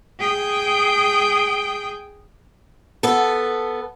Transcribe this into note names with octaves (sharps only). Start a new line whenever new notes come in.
G#4 G5
B3 A4